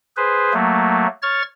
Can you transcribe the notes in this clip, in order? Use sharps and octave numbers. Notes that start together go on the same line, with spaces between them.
G#4 B4 C5
F#3 A3 A#3
C#5 C#6 F6 A6